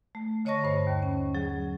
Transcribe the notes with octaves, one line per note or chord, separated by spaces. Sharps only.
A3
D3 C#5 D#5 A5 C#6 A#6
G2 C5
D#2
C#4
F#3 G#4